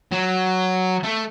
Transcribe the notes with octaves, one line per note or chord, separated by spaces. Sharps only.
F#3
A3